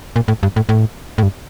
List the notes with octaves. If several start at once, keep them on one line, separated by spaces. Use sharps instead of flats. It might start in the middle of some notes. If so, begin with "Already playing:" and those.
A#2
A2
G2
A2
A2
A2
G2